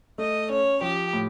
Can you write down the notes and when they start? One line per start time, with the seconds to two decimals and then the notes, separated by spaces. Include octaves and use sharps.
0.18 A3 D#5
0.50 C#4 C#5
0.82 F3 G4
1.13 A2